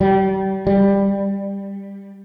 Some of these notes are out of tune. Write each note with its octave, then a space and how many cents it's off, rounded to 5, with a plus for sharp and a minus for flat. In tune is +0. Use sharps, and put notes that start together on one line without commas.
G3 -30
G3 +15